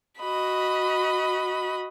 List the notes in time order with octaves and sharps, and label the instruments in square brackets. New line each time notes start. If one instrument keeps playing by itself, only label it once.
[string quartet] F#4 D#5 B5